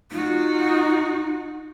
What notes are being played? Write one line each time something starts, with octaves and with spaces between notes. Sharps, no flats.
D#4 F4 F#4